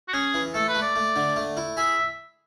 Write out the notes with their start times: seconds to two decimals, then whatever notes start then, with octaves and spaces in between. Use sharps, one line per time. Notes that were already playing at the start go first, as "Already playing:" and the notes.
0.08 F#4
0.13 C#4 G#4
0.34 E3
0.54 A3 A4
0.68 B4
0.75 A3
0.82 D5
0.96 A3
1.16 D3
1.36 A3
1.57 E4
1.77 G#4 E5